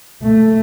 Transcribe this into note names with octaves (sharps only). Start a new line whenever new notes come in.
A3